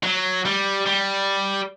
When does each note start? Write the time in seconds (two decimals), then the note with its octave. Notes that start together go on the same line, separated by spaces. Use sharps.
0.03 F#3
0.45 G3
0.86 G3